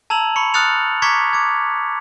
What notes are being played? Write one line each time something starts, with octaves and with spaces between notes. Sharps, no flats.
A5 A#5 E6 G#6 F7 F#7
B5 C#6 C#7
D#6 F6 F#6 A6 C#7 F7
A#5 C#6 D6 G#6 B6 C#7
D6 G#6